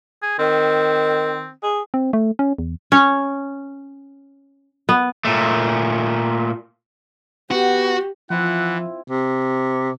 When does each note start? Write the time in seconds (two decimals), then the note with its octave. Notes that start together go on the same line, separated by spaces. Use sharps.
0.23 G#4
0.39 D#3 C4
1.63 G#4
1.94 C4
2.13 A3
2.39 C#4
2.58 E2
2.92 C#4
4.89 B3
5.25 A#2 A3
7.51 B3 F#4 G4
8.30 E3 F3 C4 E4 F4 F#5
9.10 C3